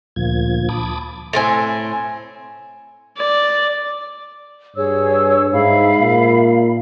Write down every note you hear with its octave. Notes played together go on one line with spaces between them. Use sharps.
D2 A#2 F3 G#6
A5 B5 D6 D#6
A2 C4 G#5
D5
G2 G#4 C#5 E6
G#2 E5 F5 B5
A#2